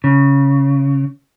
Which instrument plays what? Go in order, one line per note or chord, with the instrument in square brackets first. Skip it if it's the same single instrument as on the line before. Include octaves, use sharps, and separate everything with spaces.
[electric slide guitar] C#3